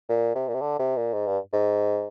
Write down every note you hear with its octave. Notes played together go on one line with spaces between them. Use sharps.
A#2
C3
A#2
C3
D3
C3
A#2
G#2
G2
G#2